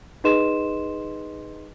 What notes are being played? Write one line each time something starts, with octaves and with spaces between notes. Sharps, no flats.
D#4 G#4 B4 D#5 C6 E7